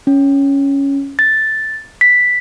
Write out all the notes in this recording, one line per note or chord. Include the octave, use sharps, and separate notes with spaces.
C#4
A6
B6